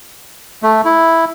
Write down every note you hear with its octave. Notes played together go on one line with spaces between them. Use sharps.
A3
E4